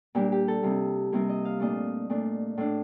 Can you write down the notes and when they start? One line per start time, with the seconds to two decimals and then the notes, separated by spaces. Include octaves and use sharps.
0.15 A#2 G3 D4 G4
0.32 G4
0.48 A4
0.63 C3 G3 A#3 D#4
1.12 C3 G3 A#3 D#4 A#4
1.29 D#5
1.45 F5
1.60 A#2 A3 D4 D#5
2.10 A#2 A3 D4
2.58 A2 A3 D4